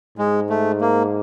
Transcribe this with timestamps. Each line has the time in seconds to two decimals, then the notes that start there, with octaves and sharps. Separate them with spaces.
0.18 G#2 G#3
0.50 A3
0.81 A#3